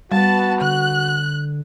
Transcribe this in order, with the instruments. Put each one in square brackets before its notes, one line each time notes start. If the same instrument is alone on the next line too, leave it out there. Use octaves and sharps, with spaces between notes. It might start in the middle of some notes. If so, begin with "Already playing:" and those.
[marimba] G3 [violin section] B3 A5 [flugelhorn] F#4
[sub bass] D3 [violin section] F#6